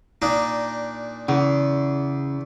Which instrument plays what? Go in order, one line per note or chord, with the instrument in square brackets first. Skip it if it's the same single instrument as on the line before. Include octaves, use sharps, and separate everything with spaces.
[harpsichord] A#2 D4 D#4
[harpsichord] E2 [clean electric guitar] C#3